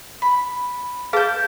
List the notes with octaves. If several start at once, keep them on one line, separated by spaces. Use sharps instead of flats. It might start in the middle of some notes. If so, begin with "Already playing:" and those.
B5
G#4 B4 F5 A5 G6